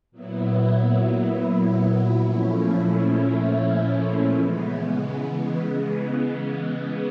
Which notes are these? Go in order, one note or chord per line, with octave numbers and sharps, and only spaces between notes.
A#2 F#3 B3 E4
A#2 F3 A3 C#4 E4
C#3 E3 G#3 B3